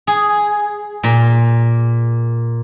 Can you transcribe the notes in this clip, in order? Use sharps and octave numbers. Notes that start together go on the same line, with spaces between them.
G#4
A#2